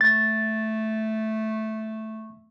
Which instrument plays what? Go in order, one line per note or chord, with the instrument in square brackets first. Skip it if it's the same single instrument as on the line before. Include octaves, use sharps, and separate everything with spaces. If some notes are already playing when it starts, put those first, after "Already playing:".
[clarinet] A3 [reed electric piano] A6